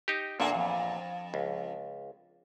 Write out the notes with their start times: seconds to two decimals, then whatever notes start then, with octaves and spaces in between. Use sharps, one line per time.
0.08 D#4 G4
0.40 E2 A#2 A#3 D4 A4
0.54 F2
1.34 C#2